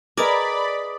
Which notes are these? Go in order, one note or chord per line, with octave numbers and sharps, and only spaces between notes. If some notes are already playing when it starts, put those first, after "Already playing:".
G#4 A#4 B4 D5 D#5 B5 D6 D#6